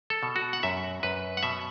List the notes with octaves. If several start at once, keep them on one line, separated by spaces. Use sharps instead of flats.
A4
B2
F#4
F#5
F#2 E5
F#2 B4
F#5
B2 E5